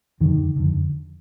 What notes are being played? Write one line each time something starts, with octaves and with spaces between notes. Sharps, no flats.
F2 D3 D#3
F2 D3